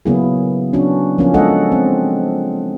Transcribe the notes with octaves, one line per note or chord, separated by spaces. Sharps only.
C#3 F#3 A#3 B3 E4 G#4
F#3 C#4 D4 F#4
F3 A#3 B3 C#4
G#3 D4 A4 D#5 F#5
C4